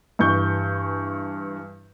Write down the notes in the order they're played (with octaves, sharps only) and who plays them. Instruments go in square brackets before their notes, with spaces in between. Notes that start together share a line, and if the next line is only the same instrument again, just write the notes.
[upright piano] G2 E3 C#6 G6